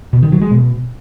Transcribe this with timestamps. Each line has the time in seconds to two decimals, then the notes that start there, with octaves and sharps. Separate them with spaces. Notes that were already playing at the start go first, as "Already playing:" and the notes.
0.13 B2
0.23 D#3
0.32 F#3
0.42 G#3
0.51 B2